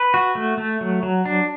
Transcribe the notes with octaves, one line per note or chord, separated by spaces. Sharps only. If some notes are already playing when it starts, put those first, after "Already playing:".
Already playing: B4
F#4
A3
A3
F#3
F#3
D4